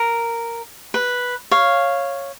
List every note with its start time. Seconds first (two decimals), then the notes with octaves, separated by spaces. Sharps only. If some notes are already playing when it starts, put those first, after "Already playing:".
Already playing: A#4
0.94 B4
1.51 C#5 F5